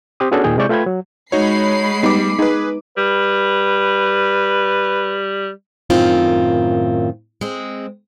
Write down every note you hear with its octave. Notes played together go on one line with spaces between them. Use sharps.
C4 G4 C6 D#6
B3 C#4 D4 F#4 G#4 A4
D#2 A#2 D#3 G#4 G5
C3 G#3 E4 D5 C#6 G6
A3 F4 B4 G5 B5 G#6
F#3
G#3 D#4 F#4 C#5 B5 C7
G3 B3 D#4 D6
D#4 G#4 B4
G3 B4
F#2 A2 D#3 C4 F4
G#3 C4